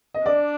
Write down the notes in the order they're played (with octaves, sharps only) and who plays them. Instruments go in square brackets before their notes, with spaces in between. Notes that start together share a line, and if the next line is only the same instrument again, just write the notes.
[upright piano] D#5
[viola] D4 [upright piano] D5